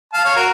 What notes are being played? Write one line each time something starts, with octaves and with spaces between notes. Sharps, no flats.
F5 A5
C#5 F5
F#4 A#4